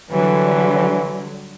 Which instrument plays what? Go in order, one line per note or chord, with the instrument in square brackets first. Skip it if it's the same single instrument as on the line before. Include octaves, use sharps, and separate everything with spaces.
[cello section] D3 F#3 G3 [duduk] E3